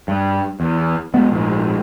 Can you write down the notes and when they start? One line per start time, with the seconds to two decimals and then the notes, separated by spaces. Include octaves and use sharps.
0.08 G2
0.60 E2
1.14 B1 G#3 B3
1.32 A#1 G#2